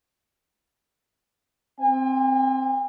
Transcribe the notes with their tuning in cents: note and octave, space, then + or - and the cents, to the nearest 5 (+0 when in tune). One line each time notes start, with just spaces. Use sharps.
C4 +0 G#5 -45